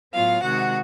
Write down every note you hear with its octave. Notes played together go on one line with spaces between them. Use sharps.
A2 F#3 B3 F4 F5
C3 D#3 G#3 F#4 F#5